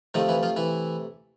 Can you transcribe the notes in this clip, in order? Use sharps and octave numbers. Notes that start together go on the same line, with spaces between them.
C3 D#3 F3 A3 D#4
E3 E4
F3 F4
E3 E4